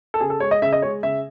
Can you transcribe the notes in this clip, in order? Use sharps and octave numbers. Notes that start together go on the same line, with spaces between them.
A4
C#3 G#4
A4
G#3 C#5
D#5
C#3 E5
D#5
G#3 C#5
C#3 E5